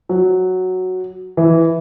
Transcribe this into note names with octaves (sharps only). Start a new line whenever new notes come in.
F#3
E3